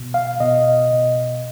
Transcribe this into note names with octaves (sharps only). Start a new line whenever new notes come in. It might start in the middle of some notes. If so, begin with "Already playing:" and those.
Already playing: B2
F5
B2 D#5
B2